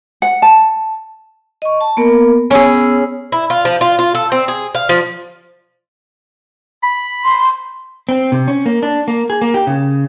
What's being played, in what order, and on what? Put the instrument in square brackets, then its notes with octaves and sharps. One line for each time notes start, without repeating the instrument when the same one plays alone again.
[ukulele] F#5
A5
[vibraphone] D#5 C#6
A5
A#3 B3 A#4
[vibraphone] B3 C#5 E6 [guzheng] C#4 G#4
[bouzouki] E4
F4
F3
F4
F4
A4
C4
G#4
F5
F3
[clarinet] B5
[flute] C6
[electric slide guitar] C4
C3
C#4
A#3
D4
A#3
G#4
A#3
G4
C#3